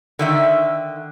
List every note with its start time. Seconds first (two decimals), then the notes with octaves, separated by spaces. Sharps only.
0.19 D3 D#3 E5